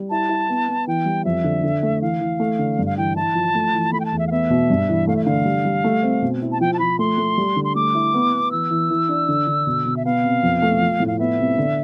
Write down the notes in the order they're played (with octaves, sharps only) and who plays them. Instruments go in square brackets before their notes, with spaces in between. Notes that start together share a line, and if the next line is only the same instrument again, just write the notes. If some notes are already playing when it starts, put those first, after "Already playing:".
Already playing: [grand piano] G3
[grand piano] E4 [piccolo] A5
[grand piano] E4
B3
B3
[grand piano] E3 [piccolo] G5
[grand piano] G3
[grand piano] F2 [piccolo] E5
[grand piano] D3
D3
A3
[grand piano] E3 [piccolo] F5
[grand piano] E3
A3
D3
G2
[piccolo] F5
[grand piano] E3 [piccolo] G5
[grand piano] E4 [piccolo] A5
[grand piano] F3
A3
E3
[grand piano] A3 [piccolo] B5
[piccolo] G5
A5
[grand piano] E2
[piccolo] E5
F5
[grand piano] B3 [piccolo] E5
[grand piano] B2
G2
E3
[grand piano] A3 [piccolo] F5
[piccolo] E5
[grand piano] D3 [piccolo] F5
[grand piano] G3
G3
A3
C4
B2
E4
[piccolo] A5
[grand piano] F3 [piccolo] G5
[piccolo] A5
[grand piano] F3 [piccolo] B5
[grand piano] A3 [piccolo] C6
[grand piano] A3
G3
D3
[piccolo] C6
[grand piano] A3 [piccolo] D6
[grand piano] E4
B3
B3
[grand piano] E3 [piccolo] E6
[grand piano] E3
E3
D4
D3
D3
B2
B2
[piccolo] E5
[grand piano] B3 [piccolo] F5
[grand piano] C3
F2
A3
F3
A2
[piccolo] F5
[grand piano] B3 [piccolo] E5
[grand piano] C3
D3